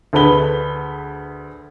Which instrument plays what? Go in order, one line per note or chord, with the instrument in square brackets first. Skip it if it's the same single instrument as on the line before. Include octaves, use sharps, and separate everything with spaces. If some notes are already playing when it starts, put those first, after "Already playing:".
[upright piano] D2 G#4 A4 B4 B5 G7